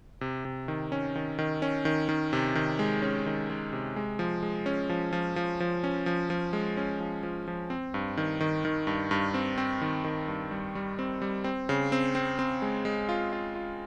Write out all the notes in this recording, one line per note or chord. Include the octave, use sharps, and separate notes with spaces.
C3
C3
D#3
C#4
D#3
D#3
C#4
D#3
D#3
C3
D#3
G#3
C#4
D#3
G#3
C3
G#3
F3
G#3
C#4
F3
F3
F3
F3
C#4
F3
F3
G#3
C#4
F3
F3
F3
C4
G2
D#3
D#3
D#3
G2
G2
C4
C4
D#3
D#3
G2
G3
G3
C4
G3
C4
C#3
C4
C4
C4
G#3
G#3
F4
F4
F4